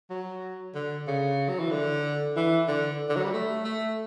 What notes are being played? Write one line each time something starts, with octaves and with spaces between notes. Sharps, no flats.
F#3
D3
C#3
F#3
E3
D3
E3
D3
D3
F#3
G3
A3
A3